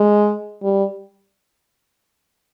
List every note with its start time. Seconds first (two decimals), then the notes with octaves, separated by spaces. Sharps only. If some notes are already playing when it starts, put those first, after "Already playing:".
Already playing: G#3
0.63 G3